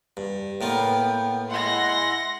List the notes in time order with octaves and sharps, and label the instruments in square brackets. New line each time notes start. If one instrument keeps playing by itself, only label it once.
[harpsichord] G2
[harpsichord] A2 A#3 F4 [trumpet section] B3 G5
[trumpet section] G#3 E4 [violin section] F#5 A#6 [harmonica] C6